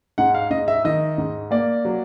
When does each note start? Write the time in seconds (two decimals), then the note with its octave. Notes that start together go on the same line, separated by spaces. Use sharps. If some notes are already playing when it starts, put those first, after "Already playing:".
0.18 G#2 F#5
0.34 F5
0.51 G#2 D#5
0.68 E5
0.85 D#3 D#5
1.18 G#2
1.51 A#3 D5
1.85 F#3